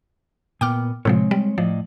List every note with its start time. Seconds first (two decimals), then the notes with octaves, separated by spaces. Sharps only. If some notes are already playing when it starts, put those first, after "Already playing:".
0.61 A#2 B3 G5 D6 F6
1.05 A2 C3 F3 G#3 C4 C#5
1.31 G3
1.58 A2 F3 D5 D#5